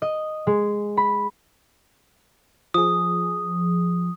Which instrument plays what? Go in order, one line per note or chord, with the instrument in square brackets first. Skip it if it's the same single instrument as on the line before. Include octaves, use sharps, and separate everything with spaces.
[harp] D#5
G#3
B5
[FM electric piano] F3 G#4 [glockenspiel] D#6